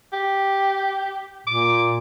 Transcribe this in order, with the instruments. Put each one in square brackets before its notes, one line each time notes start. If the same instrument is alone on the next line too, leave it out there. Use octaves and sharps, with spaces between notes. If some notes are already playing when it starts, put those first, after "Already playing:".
[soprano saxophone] G4
[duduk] A#2 [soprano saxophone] D6